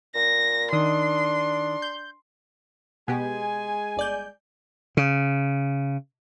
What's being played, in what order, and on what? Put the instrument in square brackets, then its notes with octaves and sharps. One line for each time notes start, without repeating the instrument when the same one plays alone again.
[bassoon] A#2 [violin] A#6
[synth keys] D#3 D#6 [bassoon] D4 [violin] C6
[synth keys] G6
[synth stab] B2 B3 G4 [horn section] G#3 G#5
[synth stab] G1 D5 G6
[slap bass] C#3